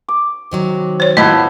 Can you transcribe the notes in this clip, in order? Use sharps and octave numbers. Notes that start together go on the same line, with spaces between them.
D6
C3 D#3 F#3
C5 C#5
A2 F3 B3 B4 D#5